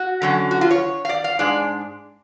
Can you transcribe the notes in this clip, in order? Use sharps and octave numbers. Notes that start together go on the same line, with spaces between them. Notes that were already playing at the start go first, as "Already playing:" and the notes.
Already playing: F#4
D3 F#3 C#4
F#4
F4
C#5
F5
D5
F5
G#2 G#3 D4 D5